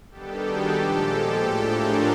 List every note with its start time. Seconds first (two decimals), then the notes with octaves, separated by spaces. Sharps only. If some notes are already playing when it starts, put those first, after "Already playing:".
0.10 D#3 G3 B3 D4 G4 A4
0.42 F#4 G#4
0.73 A#2 F3 G#3 G4 A4
1.04 G4 A4
1.36 A2 F3 A3 D4
1.66 G#4 A#4